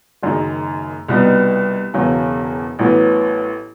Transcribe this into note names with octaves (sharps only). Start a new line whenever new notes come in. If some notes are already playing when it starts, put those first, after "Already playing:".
F#1 F#2 D#3 G#3
C2 B2 G3 B3 D#4
E1 E2 C#3 F#3
A1 A2 F#3 B3